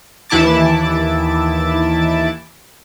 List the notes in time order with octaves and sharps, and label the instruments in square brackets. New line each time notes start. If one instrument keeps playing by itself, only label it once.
[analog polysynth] D#2 E3 E4 A5 D6 A6